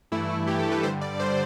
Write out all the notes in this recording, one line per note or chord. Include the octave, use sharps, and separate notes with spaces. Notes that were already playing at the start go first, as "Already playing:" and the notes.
G2 E3 A3 E4
G2 E3 A3 G4
A4
B4
G2 D3 G3 C5
D5
G2 D3 G3 C5